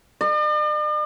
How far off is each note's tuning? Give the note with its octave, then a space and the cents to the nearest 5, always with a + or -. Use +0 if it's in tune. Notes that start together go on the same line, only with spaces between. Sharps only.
D5 +45